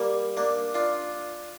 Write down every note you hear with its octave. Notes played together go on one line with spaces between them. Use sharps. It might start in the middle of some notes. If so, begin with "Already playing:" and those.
Already playing: G3 A#3
A#3 D4
D4 F4